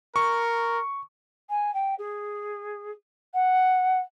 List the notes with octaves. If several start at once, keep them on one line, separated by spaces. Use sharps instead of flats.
A#4 C#6
G#5
G5
G#4
F#5